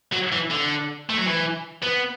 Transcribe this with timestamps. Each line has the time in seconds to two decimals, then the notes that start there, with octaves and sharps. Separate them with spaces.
0.12 F#3
0.32 E3
0.51 D3
1.10 A3
1.18 F#3
1.26 E3
1.83 B3